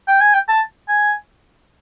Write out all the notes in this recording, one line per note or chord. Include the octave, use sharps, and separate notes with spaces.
G5
G#5
G5
A5
G#5